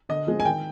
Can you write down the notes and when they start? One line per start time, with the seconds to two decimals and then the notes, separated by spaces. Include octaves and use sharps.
0.09 D3 D#5
0.27 F3 G#3 C4
0.40 G#5
0.45 D#3 G5